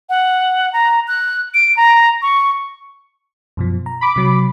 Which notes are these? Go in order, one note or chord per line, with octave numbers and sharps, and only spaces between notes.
F#5
A#5
F#6
D7
A#5
C#6
F#2 B2 F3
A#5
B5 D6
C3 F#3